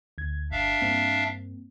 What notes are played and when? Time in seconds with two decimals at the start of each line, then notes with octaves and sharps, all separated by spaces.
0.18 D2 G#6
0.52 G1 D4 E5 F5
0.82 G2 A#3 C4